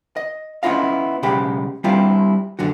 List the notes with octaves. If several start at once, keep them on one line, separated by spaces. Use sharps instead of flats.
D#5
B3 C#4 E4 F4 D#5 F5
B1 C#3 G#3 G4 B5
G3 C4 D4 E4 F4 G4
F#2 D3 F#3 F#4